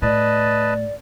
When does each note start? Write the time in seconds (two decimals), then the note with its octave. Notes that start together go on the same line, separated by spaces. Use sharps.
0.02 A2 B4 D5 D#5 A5